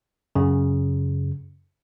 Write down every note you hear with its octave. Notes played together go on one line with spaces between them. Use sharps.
F#2 C#3